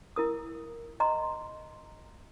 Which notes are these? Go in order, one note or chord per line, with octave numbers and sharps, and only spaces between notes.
E4 A#4 D#6
D#5 A#5 C6